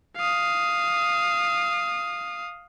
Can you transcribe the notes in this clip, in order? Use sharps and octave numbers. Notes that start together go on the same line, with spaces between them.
F5 D#6